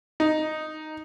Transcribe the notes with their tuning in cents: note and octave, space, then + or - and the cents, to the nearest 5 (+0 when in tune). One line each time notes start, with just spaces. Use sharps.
D#4 -5